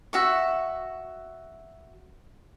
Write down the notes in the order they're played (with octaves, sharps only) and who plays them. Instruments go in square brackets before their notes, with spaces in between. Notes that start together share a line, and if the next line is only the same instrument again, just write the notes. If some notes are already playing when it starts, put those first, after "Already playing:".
[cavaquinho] F#4 E5 C#6